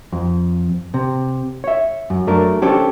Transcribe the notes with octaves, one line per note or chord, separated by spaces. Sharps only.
F2
C3
C#5 E5
F#2
F#3 A3 D4 A#4
C#4 D4 G4 A4 C5 C#5